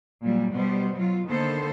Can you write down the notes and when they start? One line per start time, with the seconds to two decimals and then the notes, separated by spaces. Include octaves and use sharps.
0.22 A#2 F#3 G3
0.53 B2 G3 B3 C5
0.94 F#3 F4
1.25 D3 D#3 A#3 B3 A4 C5